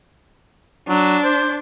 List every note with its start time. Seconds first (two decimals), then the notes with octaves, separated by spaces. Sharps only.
0.88 F#3 D4
1.24 C5